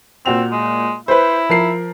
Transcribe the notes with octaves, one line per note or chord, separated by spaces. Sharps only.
A#2 C4 F#4 F7
G#3
E4 B4 C5
F3 A#4 C7